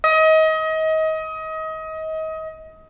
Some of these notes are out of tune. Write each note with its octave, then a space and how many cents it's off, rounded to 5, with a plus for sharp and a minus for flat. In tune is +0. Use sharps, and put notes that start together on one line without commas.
D#5 +30